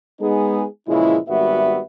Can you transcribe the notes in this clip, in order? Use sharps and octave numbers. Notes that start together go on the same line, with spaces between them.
G#3 B3 D#4 G#4
A#2 C#3 E3 F3 G#3 E4
G#1 G3 B3 F#4 E5